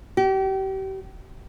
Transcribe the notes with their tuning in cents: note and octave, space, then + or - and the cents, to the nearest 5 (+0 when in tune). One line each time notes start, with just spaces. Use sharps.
G4 -35